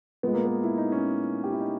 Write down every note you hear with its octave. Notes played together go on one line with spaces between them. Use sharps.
A#2 G#3 B3
A#3
B3
E4
D#4
C#4
G4
E4
D#4